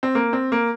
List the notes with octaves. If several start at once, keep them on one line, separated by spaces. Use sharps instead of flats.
C4
A#3
C4
A#3